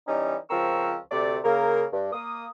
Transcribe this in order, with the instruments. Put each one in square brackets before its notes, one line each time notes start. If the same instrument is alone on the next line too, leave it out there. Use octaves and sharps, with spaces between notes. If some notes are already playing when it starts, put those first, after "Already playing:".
[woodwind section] E3 G3 C#4 D#4
C#2 F3 C4 A#4 C#6 E6
D2 C3 A3 D5
C#3 A#3 A#4
G2
A#3 D#6